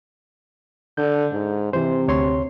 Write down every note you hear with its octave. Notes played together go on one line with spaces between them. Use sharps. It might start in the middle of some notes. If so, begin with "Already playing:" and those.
D3 G6
G#2
C3 E3 C5
D2 C#5 C6